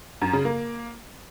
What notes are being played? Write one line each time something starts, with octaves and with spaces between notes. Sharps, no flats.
F#2
C#3
A#3